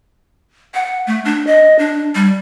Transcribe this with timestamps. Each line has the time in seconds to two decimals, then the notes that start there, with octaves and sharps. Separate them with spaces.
0.74 F#5
1.07 A3
1.25 D4
1.47 D#5
1.79 D4
2.15 G3